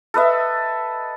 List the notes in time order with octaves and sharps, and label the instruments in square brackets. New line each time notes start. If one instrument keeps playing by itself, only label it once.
[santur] A4 B4 D#5 E5